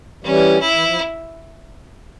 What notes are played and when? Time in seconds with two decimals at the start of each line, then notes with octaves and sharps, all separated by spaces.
0.24 E3 G3 C#4
0.61 E4
0.73 E3
0.86 F3